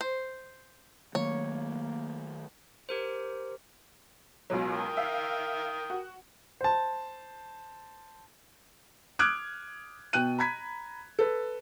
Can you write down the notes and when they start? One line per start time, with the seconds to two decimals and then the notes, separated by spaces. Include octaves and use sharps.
0.01 C5
1.15 D#3 F#3 A3 A#3 C#5
2.89 G4 A#4 C5
4.50 C#2 B2 F#3
4.72 A#4 G5 D#6
4.97 E5 F5
5.90 F#4
6.61 C5 A5
9.19 D6 D#6 F6 F#6 G#6 D7
10.13 B2 G5 F#6 D#7
10.38 A#5 B5 G#6 B6
11.19 A4 B4